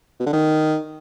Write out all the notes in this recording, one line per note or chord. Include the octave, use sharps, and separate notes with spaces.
B2
D3
D#3